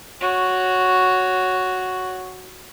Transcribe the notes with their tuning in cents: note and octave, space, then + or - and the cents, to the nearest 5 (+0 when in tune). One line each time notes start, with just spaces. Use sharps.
F#4 +0 C#5 +0